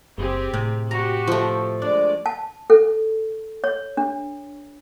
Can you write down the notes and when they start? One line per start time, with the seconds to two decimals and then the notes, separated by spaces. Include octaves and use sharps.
0.18 F#1 C4 G4 G#4
0.54 A2 C3
0.91 F#4 G4 A#5
1.27 F3 A3
1.82 G#3 D4 D5
2.26 A5
2.70 A4
3.64 C#5
3.97 D4